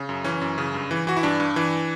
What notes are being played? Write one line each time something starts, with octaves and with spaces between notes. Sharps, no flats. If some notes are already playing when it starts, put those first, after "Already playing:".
Already playing: C#3
F#2
E3 C#4
F#2
C#3
G2
E3
E3 F#4
E4
G2 D4
G2
E3